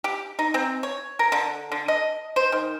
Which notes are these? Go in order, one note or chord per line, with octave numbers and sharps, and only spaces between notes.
G4
D#4
C4
C#5
A#4
D3
D3
D#5
C5
D#3